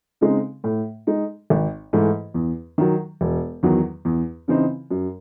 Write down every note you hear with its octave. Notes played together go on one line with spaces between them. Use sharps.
C#3 G#3 C4 D#4
A2
G#3 D#4
G#1
G#2 E3 A3
E2
D#3 F#3
E1
E2 D#3 F#3
E2
C#3 E3 C4 D#4
F#2